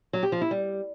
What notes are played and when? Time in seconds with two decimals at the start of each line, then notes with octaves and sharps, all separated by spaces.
0.13 F#3
0.23 G4
0.32 F3
0.41 E4
0.51 G3